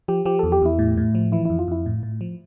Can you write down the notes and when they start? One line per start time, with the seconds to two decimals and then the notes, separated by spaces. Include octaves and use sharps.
0.08 F3 G4
0.25 F3 G4
0.39 E2 A4
0.52 G4
0.62 E2 E4
0.79 A2
0.97 A2
1.15 F3
1.32 E3 E4
1.45 F2 E4
1.59 F4
1.68 F2 E4
1.86 A2
2.03 A2
2.21 F3